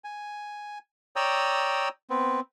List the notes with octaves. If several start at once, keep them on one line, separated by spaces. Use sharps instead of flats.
G#5
C#5 D5 G5 A#5 D#6 E6
B3 C4